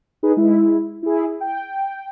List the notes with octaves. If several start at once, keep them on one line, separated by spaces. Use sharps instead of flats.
D#4 G#4 B4
G#3 E4
E4 G#4
G5